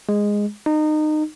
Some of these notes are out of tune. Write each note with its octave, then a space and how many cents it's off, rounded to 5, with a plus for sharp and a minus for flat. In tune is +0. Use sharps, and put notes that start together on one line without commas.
G#3 -10
D#4 -25